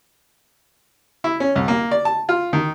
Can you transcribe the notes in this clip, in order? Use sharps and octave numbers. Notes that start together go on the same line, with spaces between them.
E4
C#4
C2
A#3
D5
A5
F4
D#3